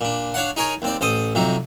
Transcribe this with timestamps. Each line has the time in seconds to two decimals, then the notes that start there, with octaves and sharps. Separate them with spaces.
0.01 A#2 D4
0.34 D4 C#5 F5 F#5
0.56 D#4 G#4 A#4 C#5 G#5
0.82 D#2 C4 D5
1.01 A1 A4 C5 D#6
1.35 F2 C3 F#3 D#4